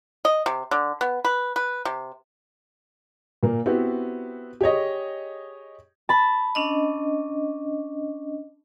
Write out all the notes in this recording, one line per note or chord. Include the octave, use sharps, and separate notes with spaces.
D#5
C3
D3
B3
B4
B4
C3
A#2 A#3
B3 C4 E4 F#4 G4
G4 G#4 C#5 D#5
A5 B5
C#4 D4 D#5